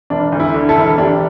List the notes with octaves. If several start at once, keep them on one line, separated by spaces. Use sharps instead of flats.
E1 D4
D2
E4
D3
E4 A4
E1
E1 D4 G4